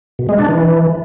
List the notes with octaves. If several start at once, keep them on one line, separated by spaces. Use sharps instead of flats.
B2
G#3
D4
E3